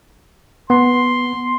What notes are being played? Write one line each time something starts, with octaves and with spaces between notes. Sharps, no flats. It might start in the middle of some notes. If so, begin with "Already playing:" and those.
B3 C6